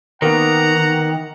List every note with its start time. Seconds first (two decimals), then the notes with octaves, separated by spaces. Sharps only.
0.22 D#3 A#3 B3 F#5 A#5